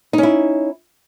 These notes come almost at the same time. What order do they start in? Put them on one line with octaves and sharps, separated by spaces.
D#4 C#4 E4